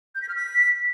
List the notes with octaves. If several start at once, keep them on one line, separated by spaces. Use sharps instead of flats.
G6
B6
F6
B6